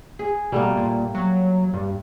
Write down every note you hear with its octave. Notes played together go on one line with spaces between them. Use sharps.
G#4
B2 G3 A3 A#3
A#2
F#3
G2